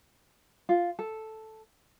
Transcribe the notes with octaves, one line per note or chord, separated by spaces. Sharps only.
F4
A4